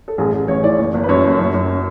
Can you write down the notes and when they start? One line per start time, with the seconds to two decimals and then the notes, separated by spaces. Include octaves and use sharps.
0.08 A4
0.18 A1 G#4
0.33 A1
0.48 A1 C#5
0.63 E3 D5
0.78 F#1 D5
0.94 F#1
1.04 B4
1.09 F#2 C#5
1.24 F#1
1.39 F#2
1.54 F#2